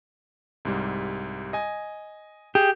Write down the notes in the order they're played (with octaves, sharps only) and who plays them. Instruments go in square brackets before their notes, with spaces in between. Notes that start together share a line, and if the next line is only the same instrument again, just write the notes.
[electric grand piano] C2 G#2 G3
D#5 G#5
[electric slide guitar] G4 [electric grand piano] G#4